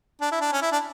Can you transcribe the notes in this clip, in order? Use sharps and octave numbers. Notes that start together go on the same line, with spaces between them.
D4
E4
D4
C#4
E4
D4